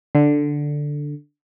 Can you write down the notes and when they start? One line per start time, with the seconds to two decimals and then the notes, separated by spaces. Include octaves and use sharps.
0.15 D3